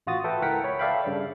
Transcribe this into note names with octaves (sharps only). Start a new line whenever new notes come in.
A1 F4 F#4 D#6 A6
A4 B4 E5 G5
C#2 E4 A#4 F#5 G5 B6
C#5 B5
A4 D5 E5 F5 G5 B5
G2 C#3